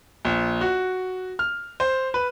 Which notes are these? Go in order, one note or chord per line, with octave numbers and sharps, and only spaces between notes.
A#1
F#4
F6
C5
B4